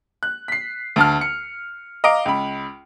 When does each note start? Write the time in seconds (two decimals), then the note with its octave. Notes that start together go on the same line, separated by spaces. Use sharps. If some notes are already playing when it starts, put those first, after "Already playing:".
0.23 F#6
0.48 B6 C7
0.96 D2 A5 F6
1.21 C#7
2.04 D#5 F5 A#5 D6 D7
2.25 C#2 B5